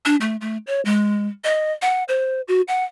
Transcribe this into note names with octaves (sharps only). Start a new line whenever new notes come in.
D4
A3
A3
C#5
G#3
D#5
F#5
C5
F#4
F#5